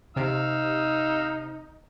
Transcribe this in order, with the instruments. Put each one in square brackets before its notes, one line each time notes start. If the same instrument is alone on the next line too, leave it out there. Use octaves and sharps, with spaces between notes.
[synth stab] C3 [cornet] D#4 [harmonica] F5 E6